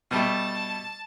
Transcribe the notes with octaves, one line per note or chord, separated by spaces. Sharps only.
B2 G3 A3 A5